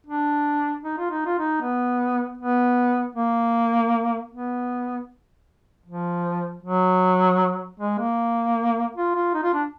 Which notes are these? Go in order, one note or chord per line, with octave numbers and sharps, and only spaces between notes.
D4
D#4
F4
D#4
F4
D#4
B3
B3
A#3
B3
F3
F#3
G#3
A#3
F4
F4
D#4
F4
D4